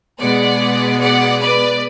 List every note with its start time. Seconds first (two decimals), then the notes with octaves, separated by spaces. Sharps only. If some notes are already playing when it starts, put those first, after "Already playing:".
0.20 B2 G#3 B3 D5 F#5
1.00 D5 F#5
1.40 B4 D5